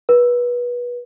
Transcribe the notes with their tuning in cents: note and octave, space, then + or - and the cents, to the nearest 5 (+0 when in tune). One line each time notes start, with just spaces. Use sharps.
B4 -25